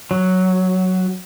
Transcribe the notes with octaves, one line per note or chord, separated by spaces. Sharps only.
F#3